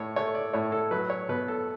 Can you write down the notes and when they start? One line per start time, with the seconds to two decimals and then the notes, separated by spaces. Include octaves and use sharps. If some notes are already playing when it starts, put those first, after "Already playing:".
Already playing: A2 C#5
0.16 A3 C#5
0.35 D5
0.53 A2 C#5
0.72 A4
0.91 F#3 B4
1.10 C#5
1.29 B2 B4
1.48 A4